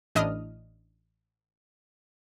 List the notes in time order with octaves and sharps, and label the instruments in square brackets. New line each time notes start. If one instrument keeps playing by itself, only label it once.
[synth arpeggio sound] A1 D4 E4 D#5 D#6 F6